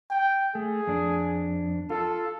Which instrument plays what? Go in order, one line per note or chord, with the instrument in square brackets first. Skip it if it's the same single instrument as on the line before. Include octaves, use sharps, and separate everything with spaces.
[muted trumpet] G5
[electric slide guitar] A3 [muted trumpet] G#4
[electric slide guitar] F2 D4
[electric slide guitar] F4 [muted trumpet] A4